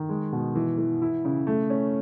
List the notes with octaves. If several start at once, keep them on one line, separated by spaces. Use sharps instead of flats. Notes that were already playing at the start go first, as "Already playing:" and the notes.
Already playing: D#3
G#3
B2
E3
E3
E4
C#3
A3
C#4